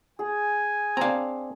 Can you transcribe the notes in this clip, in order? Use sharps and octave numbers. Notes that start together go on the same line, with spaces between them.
G#4 G#5
C4 D4 F5 A#5